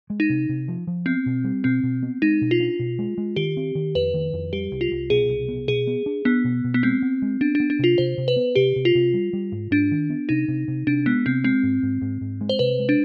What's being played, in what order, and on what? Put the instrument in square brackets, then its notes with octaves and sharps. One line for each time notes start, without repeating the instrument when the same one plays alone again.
[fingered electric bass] G#3
[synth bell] D#4
[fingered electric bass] C3
C3
F3
F3
[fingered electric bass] B3 [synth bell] C4
[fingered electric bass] B2
G3
[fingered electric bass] B2 [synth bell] C4
[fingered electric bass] B2
B3
[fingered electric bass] G#3 [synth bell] D#4
[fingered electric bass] B2
[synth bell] F4
[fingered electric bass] D4
B2
G#3
G#3
[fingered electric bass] D#3 [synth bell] G4
[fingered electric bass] C4
D#3
[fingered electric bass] F2 [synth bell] B4
[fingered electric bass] D#3
F2
[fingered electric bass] G3 [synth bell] G4
[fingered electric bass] C2
[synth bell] F4
[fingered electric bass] C2
[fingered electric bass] B2 [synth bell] G#4
[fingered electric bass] C2
B3
[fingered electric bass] B2 [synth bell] G#4
[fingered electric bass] B3
D4
[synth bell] B3 [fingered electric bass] D4
[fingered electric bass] B2
B2
[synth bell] B3
[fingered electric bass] G#3 [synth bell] C4
[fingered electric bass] B3
G#3
[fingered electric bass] B3 [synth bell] D4
[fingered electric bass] B3 [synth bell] D4
[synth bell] D4
[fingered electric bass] C3 [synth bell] F4
[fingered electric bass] C3 [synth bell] C5
[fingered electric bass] C3
[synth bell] B4
[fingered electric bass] B3
[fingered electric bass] C3 [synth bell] G4
[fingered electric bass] C3
[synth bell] F4
[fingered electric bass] C3
G3
G3
G#2
[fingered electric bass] G#2 [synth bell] D4
[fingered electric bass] D#3
B3
[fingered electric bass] C3 [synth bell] D#4
[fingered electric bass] C3
C3
[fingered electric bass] C3 [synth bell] D4
[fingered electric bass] G#3 [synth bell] B3
[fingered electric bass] C3 [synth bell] C4
[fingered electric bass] G#3 [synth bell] C4
[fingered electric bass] G#2
G#2
G#2
G#2
G#3
[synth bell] C5
[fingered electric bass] C3 [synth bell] B4
[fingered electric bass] G#3
[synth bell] D4